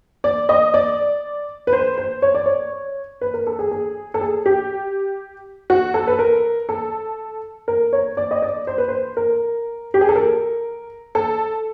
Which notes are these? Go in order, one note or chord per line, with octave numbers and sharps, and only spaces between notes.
D5
D#5
D5
B4
C5
C5
C#5
D5
C#5
B4
A#4
A4
G#4
G#4
A4
G#4
G4
F#4
A4
B4
A#4
A4
A#4
C#5
D5
D#5
D5
C5
B4
C5
A#4
G4
G#4
A4
A#4
A4